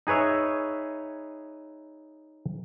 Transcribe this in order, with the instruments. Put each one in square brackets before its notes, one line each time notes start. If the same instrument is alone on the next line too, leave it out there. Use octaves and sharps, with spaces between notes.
[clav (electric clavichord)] D#4 G#4 B4 C#5 E5